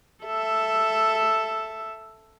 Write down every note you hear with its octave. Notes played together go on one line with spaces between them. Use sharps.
A4 E5